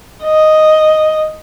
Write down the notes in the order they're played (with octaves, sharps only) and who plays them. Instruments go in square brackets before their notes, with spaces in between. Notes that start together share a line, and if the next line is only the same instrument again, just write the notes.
[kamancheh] D#5